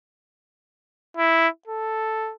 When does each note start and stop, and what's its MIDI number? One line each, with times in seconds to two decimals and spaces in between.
1.17 1.48 64
1.67 2.32 69